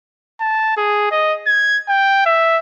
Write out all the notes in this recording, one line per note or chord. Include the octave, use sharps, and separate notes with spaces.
A5
G#4
D#5
G#6
G5
E5